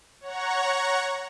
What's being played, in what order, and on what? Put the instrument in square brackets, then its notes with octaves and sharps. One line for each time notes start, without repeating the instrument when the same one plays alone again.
[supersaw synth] C#5 F#5 A#5 C#6